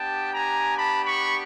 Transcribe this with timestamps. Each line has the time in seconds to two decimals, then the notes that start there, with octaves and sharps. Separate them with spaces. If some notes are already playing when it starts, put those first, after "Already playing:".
Already playing: B3 D4 G4 G5 A5
0.33 G#5 A#5
0.76 A5 B5
1.05 B5 C#6